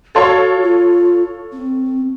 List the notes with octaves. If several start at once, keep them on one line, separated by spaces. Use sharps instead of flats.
F#4 A4 C#5 F5
F4
C4